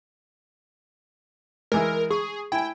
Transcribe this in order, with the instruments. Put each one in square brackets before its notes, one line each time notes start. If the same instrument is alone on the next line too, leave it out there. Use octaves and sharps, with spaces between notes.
[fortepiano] E3 G#3 [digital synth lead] A#4
[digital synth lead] G#4 [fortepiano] C#6
[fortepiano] E4 G#5 [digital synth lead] G5